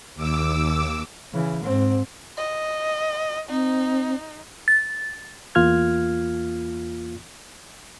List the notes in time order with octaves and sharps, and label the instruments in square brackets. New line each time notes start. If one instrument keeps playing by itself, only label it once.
[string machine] D#2 D6 E6
[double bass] C#3 E3
G#2 C4
[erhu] D#5
[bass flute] C4 [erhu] D#4
[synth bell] A6
[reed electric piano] E2 A#3 F4 F6 G#6